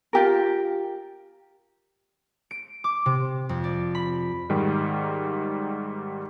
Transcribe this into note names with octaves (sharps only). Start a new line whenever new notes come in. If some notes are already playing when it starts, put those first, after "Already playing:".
F4 G4 A#4
D7
D6
C3
F2
D5
B5
G#2 D#3 G3